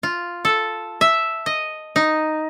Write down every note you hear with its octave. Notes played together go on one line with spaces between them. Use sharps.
F4
A4
E5
D#5
D#4